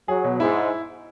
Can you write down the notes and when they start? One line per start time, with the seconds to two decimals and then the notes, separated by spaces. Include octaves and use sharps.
0.08 F#3 G#4
0.24 B2
0.40 G#2 E4